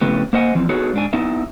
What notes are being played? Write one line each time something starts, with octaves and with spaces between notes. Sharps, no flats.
F2 A2 C#3 B3 G4
A#3 C5 D#5 F#5 G#5
E3 F3 C4
B3 D#4 F#4 G#4 A4 C#5
G#2 D4 G#5
B3 D#4 E4 E5